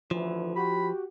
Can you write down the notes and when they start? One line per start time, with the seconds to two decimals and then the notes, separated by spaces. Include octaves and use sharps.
0.11 A1 D2 E3 F3
0.56 F#4 G4 B5